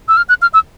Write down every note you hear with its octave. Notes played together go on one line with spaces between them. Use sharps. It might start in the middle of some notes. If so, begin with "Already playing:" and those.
E6
F6
F#6
F6
E6